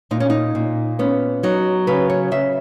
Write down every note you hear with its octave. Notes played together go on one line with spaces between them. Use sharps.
A#2 D#4
C#4
D#4
A#2
B3 C#4
F#3 D#4
C#3 B4
C#5
C#3 E5